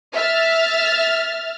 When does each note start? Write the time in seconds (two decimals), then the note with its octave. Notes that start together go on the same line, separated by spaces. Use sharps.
0.13 E5 F6 A6